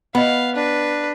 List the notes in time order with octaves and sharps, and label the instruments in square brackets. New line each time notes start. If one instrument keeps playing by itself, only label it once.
[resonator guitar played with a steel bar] B3 [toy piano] D#5 B5 [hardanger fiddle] F5
[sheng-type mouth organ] D4 [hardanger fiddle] B4